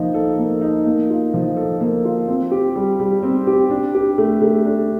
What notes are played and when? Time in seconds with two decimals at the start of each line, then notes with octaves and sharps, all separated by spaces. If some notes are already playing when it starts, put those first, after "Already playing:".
Already playing: F3 A#3 D#4
0.14 A4
0.39 A#3
0.61 D#4
0.86 A#3
1.10 F4
1.34 F3
1.56 A4
1.80 A#3
2.05 F4
2.28 C4
2.51 G4
2.76 G3
3.00 G3
3.23 C4
3.47 G4
3.70 D4
3.95 G4
4.18 A3
4.42 A3
4.66 D4